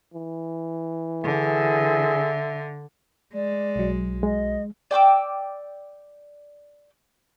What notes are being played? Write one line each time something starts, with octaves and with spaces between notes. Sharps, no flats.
E3
D3 G#4 E5
G#3 D5
B1 F#3
G#3 D#5
D5 G5 D6 E6